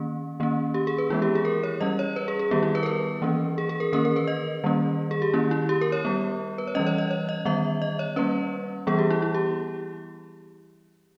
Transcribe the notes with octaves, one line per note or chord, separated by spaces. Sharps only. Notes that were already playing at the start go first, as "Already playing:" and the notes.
Already playing: D#3 A#3 C#4
D#3 A#3 C#4
G4
G#4
B4
E3 G#3 B3 E4
G4
G#4
A#4
C#5
G3 C#4 D#5
C#5
B4
G#4
G#4
D#3 G3 B3 G4
E4
B4
A#4
B4
E3 A#3 C#4
G#4
G#4
A#4
D#3 A#3 C#4 A#4
A#4
B4
D#5
D#3 G3 A#3 C#4
G#4
G4
D#3 A#3 C#4 E4
E4
G4
A#4
C#5
G3 B3
B4
C#5
E3 G3 C#4 D#5
C#5
D#5
C#5
D#5
D#3 G3 B3 E5
D#5
C#5
G3 A#3 C#4 B4
E3 G3 B3 G#4
G4
E4
E4
G4